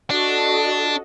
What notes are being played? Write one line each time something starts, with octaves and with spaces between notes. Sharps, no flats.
D4 F#4 A4 D#5